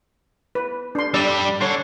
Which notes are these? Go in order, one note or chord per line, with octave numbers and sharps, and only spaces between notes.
B4
D4 C6
G2 G3 D4 D5 E6
D3 C#5 C6